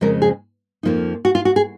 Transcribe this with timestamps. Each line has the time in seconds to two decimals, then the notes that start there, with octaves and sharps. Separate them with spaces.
0.01 F2 C#3 F3 G#3 C#4 A#4
0.22 G#4
0.83 F2 F3 A#3 D#4
1.25 F#4
1.35 F4
1.45 F#4
1.56 G#4